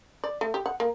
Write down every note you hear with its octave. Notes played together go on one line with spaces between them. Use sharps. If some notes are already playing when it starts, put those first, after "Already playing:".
D5
A3
G4
F#5
A#3